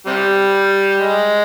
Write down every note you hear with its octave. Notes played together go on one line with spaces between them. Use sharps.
C3 G3
G#3